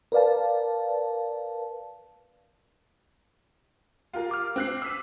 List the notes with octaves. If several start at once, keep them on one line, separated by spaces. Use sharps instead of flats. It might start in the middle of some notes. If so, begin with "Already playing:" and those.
A#4 B4 D5 F5 A5
F4 G4 A#4
D6 F6
C4 F#6 C7
E6 B6 D#7